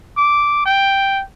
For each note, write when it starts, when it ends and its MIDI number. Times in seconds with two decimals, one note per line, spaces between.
0.17 0.63 86
0.66 1.22 79